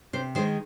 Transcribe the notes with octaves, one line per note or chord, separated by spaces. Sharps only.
C3 C5
D#3 G#3 C5